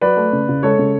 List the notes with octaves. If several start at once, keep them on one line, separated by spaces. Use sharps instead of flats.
F#3 B4 D5
A3
C#3
C#3
G#3 A4 C#5
C#3